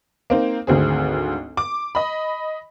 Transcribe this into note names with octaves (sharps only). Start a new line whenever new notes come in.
A#3 C4 D#4
G#1 D2 C4 G#4
D6
D#5 B5